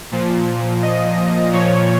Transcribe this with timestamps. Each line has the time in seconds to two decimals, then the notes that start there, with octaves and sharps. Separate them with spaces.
0.11 A#2 F3
0.82 D#5
1.53 A#2 F3 C#5